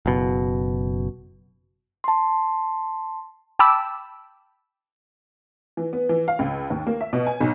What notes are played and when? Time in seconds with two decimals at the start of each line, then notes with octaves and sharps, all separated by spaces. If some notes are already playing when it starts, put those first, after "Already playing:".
0.06 F#1 B2
2.04 A5 C6
3.59 G5 A5 B5 D6 E6
5.77 E3
5.93 B3
6.09 E3
6.28 F5
6.39 C#2
6.70 D#2
6.87 A#3
7.01 E5
7.13 B2
7.27 G#5
7.40 B1